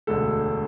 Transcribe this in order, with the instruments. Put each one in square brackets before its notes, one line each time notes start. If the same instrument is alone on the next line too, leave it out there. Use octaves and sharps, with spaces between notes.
[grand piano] E1 D2 D3 G#3 A4